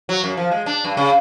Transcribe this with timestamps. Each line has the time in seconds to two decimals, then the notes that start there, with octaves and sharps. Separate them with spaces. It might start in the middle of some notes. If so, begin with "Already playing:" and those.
0.09 F#3
0.23 F#2
0.37 F3
0.52 G#3
0.66 D4
0.85 G2
0.97 C#3